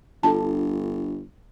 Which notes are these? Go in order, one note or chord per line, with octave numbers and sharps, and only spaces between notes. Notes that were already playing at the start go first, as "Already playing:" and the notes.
G1 D4 F4 A4 A5